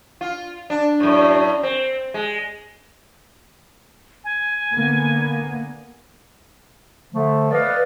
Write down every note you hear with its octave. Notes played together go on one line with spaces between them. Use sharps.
F4
D4
F#2 A2
C4
G#3
G#5
D3 A#3 B3
D3 F3 A3
B4 D5 D#5 F5